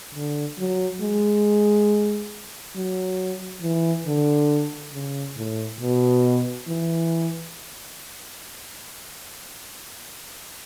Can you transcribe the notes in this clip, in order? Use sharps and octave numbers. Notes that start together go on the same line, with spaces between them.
D3
F#3
G#3
F#3
E3
D3
C#3
A2
B2
E3